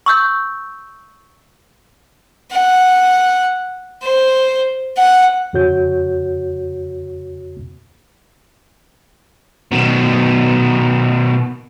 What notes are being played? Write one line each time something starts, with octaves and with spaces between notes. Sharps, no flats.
C#6 E6 G6
F#5
C5
F#5
F2 C#3 F#4 C#5 G6
B2 D#3